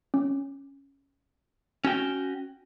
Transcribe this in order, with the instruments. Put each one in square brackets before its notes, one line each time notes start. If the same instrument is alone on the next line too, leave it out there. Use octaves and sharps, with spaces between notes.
[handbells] C#4
[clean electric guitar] C#4 F#4 G5